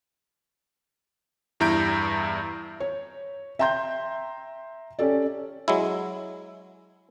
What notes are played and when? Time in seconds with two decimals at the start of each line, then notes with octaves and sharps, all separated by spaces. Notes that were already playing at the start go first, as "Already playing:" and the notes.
1.60 E2 G2 E4 A#5 G6 D7
2.80 C#5
3.59 E5 G5 A#5 C6 G6
4.99 C#4 G4 A4 D5
5.68 F#3 G#3 E4